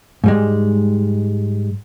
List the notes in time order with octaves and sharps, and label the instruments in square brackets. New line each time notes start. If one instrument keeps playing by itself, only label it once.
[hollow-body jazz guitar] G#2 G3 G#3